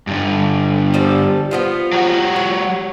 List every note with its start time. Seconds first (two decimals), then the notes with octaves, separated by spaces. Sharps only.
0.07 G2 D3
0.94 F3 G3 A4
1.51 F3 B3 F4
1.92 F#3 G4 F#5
2.36 C#5